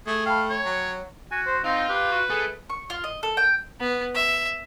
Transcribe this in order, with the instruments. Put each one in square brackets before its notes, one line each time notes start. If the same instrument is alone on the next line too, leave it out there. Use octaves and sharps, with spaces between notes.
[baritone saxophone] A3 [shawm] G#4
[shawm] F5 [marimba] G5 A5 B5
[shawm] C#5
[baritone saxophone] F#3
[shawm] F#4 [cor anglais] G#5
[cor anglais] C5
[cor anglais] C4 [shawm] D#4 [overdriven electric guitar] F4
[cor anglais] G4 [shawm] B4
[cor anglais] F#4
[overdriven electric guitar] A3 [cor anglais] G#4
[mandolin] C#6
F4
D#5
A4
G5
[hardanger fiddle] B3
E5